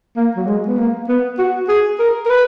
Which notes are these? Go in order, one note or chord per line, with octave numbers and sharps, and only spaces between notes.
A#3
F#3
G#3
B3
A#3
B3
F#4
G#4
A#4
A#4
B4